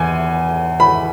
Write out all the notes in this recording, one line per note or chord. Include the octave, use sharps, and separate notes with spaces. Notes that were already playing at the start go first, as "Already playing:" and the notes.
Already playing: E2 G#5
B5